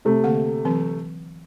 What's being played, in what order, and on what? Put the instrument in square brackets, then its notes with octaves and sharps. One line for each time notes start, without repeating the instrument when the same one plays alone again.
[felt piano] C3 A3
[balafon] D3 A#3 F#5
E3 F#3 C4